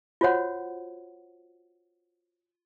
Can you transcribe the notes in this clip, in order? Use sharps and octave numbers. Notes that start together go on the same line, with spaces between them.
F4 F#4 C5 C#5 F#5